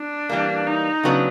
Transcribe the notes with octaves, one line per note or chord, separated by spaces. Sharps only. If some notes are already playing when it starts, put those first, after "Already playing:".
Already playing: D4
E3 G3 A#3
D#4
C#3 F#3 B3 D4